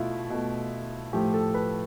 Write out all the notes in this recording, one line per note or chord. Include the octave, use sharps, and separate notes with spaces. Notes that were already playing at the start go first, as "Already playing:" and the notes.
Already playing: B2 A3 E4 F4
B2 A3
A2 F3 A3 G4
A4
B4